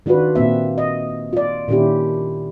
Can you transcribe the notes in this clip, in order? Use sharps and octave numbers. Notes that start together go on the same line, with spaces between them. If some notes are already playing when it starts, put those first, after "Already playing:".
D#3 D4 F4 F#4 B4
A#2 A#3 C4 E5
D#5
F4 D5
A#2 D#3 C#4 D4 E4 G4